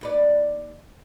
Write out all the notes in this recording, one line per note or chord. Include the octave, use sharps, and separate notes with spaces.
D#2 B4 D5